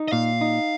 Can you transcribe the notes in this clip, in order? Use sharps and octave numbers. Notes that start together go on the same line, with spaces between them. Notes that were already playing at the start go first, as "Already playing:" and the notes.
Already playing: D#4
D#5
A#2 F5
D#4